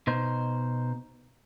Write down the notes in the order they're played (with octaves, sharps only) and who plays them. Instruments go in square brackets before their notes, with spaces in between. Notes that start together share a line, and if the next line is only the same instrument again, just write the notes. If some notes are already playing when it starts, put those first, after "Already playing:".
[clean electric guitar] B2 D#4 C5